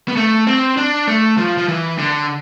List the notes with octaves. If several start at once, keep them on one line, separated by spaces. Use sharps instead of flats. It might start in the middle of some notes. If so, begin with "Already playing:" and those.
B3
A3
C4
D4
A3
F3
F3
E3
D3